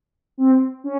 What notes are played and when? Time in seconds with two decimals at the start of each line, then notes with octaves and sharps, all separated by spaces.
0.38 C4
0.84 C#4